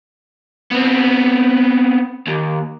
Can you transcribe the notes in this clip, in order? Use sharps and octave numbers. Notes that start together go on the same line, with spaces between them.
B3 C4
D#2